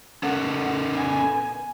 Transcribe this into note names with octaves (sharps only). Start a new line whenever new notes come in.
C#4 A4 A#4 F#5
B3 G#5